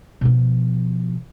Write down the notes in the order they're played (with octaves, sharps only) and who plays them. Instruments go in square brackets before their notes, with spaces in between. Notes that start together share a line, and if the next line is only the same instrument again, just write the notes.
[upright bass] B2 F3